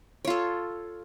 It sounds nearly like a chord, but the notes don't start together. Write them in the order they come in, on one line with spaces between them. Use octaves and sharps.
C#5 F4 A4